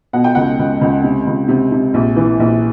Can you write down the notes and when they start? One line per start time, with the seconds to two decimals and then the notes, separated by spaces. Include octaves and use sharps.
0.13 B2 F#5
0.24 G5
0.35 C#2 F#5
0.59 C#2
0.81 C#2
1.04 C3
1.27 C#2
1.48 C3
1.72 C3
1.94 A#1
2.16 E3
2.40 A#1